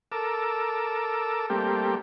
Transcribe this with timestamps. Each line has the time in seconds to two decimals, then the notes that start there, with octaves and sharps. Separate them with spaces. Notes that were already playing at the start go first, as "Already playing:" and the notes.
0.12 A4 A#4 D6 E6
1.50 G3 A3 A#3 C4 G4